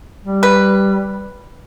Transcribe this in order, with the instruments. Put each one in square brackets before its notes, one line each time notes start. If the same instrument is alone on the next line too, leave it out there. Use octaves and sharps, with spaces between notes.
[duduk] G3
[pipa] B4